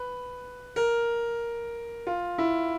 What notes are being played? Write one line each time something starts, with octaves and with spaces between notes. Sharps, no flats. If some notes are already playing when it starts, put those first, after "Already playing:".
Already playing: B4
A#4
F4
E4